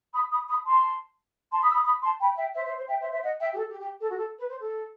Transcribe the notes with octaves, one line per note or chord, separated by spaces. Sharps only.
B5 D#6
B5 D#6
B5 D#6
A5 C6
A5 C6
B5 D#6
E6
B5 D#6
B5 D#6
A5 C6
G5 B5
E5 G5
C5 E5
C5 E5
C5
E5 G5
C5 E5
C5 E5
D#5 F#5
E5 G5
G4
A4
G4
G4
A4
F#4
A4
B4
C5
A4